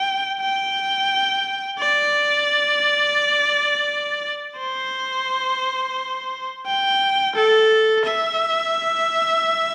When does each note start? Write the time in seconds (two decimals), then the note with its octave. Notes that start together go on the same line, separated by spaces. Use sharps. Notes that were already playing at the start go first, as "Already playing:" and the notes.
Already playing: G5
0.41 G5
1.79 D5
4.58 C5
6.66 G5
7.35 A4
8.06 E5